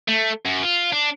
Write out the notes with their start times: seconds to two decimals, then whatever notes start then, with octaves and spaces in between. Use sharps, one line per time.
0.08 A3
0.46 F#2
0.63 F4
0.93 D4